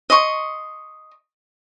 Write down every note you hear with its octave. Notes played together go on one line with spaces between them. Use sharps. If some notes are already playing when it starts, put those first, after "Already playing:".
D#5 C6 C#6